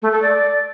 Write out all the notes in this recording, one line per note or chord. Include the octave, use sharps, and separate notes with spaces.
A3
A4
D5